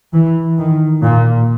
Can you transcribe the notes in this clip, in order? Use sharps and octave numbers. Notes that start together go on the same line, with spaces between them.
E3
D#3
A#2